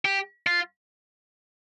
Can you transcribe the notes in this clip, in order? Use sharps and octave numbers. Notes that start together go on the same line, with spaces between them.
G4
F4